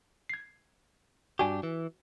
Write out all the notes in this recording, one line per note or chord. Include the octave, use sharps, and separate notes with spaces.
G#6 C7
G2 D4 F#4 G4 G#5
E3